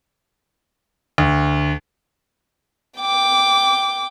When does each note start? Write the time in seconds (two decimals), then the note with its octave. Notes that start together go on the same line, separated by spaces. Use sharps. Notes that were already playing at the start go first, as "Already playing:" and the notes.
1.18 D2
2.99 G5 D6